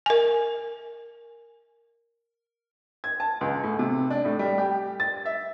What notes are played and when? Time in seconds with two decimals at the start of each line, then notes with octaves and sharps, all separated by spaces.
0.06 A#4 G#5
3.04 G#6
3.20 A5
3.41 C#2
3.63 A2
3.79 C3
4.10 D4
4.25 A2
4.39 G3
4.58 G4
5.00 A6
5.25 E5